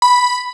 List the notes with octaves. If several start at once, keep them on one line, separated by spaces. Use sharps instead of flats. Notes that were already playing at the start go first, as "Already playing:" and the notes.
B5